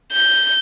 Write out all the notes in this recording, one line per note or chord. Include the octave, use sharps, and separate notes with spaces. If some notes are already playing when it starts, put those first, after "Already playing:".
G6